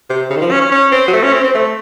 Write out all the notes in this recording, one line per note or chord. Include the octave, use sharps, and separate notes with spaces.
C3
C#3
D#3
F3
C#4
C#4
C#4
C4
F#3
A3
C#4
C4
C4
A3